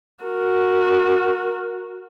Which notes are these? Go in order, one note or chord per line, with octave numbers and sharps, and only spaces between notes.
F#4 A#4